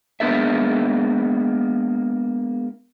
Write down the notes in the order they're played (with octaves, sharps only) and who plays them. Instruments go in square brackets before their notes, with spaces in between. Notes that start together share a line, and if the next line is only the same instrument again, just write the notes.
[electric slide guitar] G#3 A#3 B3 D4 A4 E5